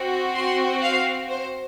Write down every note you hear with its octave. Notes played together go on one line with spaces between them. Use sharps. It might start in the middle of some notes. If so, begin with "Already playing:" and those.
Already playing: C4 F#4
C6
F5
C5